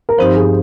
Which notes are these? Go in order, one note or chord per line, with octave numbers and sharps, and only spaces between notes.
A#4
G2 F3 C4 D#4 G4 C5
G#4